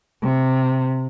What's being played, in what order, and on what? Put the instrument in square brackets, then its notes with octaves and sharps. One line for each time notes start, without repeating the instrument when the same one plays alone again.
[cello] C3